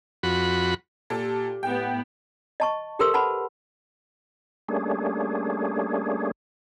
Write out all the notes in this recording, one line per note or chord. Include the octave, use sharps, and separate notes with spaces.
F2 F#4 B5
A#2 G4 A4
A2 B3 G5
D#5 A5 C#6
G4 A4 A#4 C5 C6 E6
B4 F#5 A5 B5
G3 A3 A#3 C#4 D4 G#4